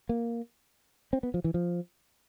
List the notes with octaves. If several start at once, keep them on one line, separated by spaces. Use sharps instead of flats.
A#3
C4
B3
F3
E3
F3